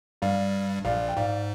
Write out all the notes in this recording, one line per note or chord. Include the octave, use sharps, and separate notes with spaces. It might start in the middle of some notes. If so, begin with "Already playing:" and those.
G2 G3 D5 F5
A#1 A#2 D5 F5
G5
G#2 D5 F5